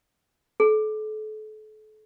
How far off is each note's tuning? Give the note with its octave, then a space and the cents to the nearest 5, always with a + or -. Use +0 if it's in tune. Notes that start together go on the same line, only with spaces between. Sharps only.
A4 -35